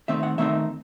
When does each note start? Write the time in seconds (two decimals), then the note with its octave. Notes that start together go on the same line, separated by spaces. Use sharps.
0.08 D#3 A3 C4 D#4 E5
0.23 F#5
0.38 D#3 A3 C4 D#4 E5